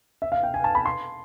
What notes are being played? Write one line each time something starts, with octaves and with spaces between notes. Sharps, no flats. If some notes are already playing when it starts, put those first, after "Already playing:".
E5
F5
G5
G#5
A5
B5
C6